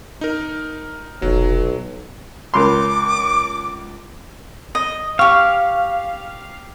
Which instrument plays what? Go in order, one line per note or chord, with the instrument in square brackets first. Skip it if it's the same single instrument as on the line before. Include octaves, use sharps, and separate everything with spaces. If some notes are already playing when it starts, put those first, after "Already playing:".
[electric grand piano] D#4 A#4
[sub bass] F1 [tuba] B1 [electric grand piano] F#3
[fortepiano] C#2 C6 [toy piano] A#4 B5 [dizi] D6
[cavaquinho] D#5
[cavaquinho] G4 C#6 [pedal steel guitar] F5